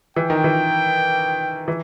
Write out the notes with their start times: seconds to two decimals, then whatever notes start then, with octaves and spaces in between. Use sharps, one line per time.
0.16 E3 G5
0.30 D#3
0.44 E3
1.68 E3